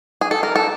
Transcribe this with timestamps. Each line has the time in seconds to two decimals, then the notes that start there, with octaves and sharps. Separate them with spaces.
0.21 G#4
0.31 A4
0.43 A#4
0.56 A4